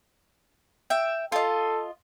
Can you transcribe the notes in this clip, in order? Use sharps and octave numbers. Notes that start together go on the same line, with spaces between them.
E5 G5
F4 A4 D#5